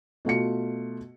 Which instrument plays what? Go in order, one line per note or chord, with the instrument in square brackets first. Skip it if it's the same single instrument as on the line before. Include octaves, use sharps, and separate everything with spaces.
[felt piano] B2 A3 F4 C#7